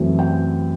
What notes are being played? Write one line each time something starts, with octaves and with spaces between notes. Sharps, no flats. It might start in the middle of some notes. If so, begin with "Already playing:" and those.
Already playing: F#2 E3 A3 C4
G5